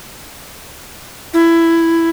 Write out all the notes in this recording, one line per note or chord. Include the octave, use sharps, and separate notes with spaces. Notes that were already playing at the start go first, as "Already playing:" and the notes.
E4